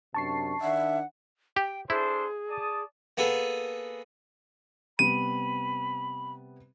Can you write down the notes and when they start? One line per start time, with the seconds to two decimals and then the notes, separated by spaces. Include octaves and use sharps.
0.14 F#2 C3 D4 A5 C#6 C7
0.61 D#3 D4 E5 F#5
1.57 G4 G5
1.90 D4 E4 G#4 A4 C5
2.50 D5 A5 D#6
3.17 A#3 B3 G#4 A4
4.99 C3 G3 B3 B5 D#7